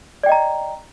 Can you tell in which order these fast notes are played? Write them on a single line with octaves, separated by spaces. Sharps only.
D5 G5 D#5 A#5